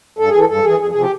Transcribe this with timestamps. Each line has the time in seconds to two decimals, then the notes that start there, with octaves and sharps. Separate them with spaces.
0.19 G2 A4
0.29 G#4
0.35 E3 A4
0.49 G2 A4
0.64 E3 G#4
0.80 F2 G#4
0.91 C3 F3 G#4
1.01 G4